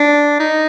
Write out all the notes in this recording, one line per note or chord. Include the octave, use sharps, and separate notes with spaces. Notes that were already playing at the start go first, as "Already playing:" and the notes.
Already playing: D4
D#4